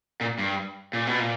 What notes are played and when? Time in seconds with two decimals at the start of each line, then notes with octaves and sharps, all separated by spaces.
0.21 A#2
0.39 G2
0.93 A#2
1.07 B2
1.20 A#2